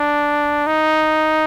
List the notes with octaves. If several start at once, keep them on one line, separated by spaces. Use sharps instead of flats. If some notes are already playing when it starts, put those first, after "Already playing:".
Already playing: D4
D#4